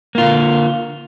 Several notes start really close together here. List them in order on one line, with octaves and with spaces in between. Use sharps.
A#3 F4 D3